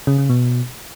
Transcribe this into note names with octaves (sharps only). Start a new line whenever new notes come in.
C#3
C#3
B2